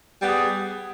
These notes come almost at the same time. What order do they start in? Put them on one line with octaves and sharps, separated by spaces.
G3 B3 G#4